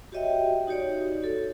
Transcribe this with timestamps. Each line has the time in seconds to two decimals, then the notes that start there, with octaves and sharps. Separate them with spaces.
0.12 F#4 G4 C#5 D#5 E5 G5
0.67 D#4 F#4 G4 C#5 D5
1.22 F#4 A4